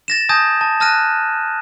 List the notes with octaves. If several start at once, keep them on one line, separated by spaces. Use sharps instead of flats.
A6 A#6 E7
G#5 A5 D#6 G6 G#6 A#6
A5
A5 D#6 F6 F#6 A#6 D#7